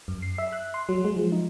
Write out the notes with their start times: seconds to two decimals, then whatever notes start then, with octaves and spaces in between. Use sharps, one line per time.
0.08 F#2
0.22 C7
0.38 E5
0.52 F#6
0.74 C6
0.89 F#3
1.05 G#3
1.16 F3
1.32 D#4